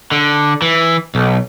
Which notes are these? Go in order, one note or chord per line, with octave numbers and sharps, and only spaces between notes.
D3
E3
B1